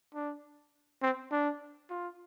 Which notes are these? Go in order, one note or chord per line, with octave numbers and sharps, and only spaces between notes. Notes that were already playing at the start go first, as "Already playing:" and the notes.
D4
C4
D4
F4